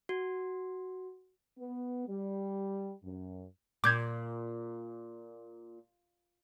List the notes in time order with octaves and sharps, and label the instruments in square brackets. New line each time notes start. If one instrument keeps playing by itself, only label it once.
[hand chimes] F#4
[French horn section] B3
G3
F#2
[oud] A#2 [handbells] D6 G6 G#6